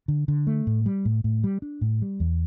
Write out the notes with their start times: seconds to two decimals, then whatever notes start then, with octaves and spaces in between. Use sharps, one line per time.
0.08 D3
0.28 D3
0.47 A3
0.67 A2
0.86 G3
1.05 A2
1.24 A2
1.44 G3
1.62 D4
1.81 A2
2.02 G3
2.20 E2